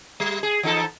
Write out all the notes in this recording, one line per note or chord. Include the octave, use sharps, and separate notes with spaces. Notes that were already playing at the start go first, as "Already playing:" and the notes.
G3
G#4
E3 D#4 A4